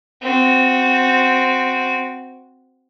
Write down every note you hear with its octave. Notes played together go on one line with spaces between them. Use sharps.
C4 F#4